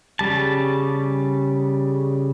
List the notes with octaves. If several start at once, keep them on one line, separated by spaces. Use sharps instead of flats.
C#3 G3 A5